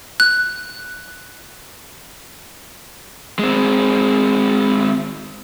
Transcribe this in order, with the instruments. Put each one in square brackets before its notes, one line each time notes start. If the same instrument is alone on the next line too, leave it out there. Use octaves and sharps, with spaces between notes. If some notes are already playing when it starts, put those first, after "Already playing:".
[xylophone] F#6
[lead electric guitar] G#3 C4